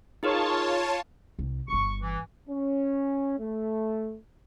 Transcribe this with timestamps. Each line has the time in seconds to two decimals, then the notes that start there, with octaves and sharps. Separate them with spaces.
0.23 D#4 F4 G#4 A#4 C#5 A5
1.39 C2
1.68 D1 G1 C#6
2.02 E3
2.48 C#4
3.39 A3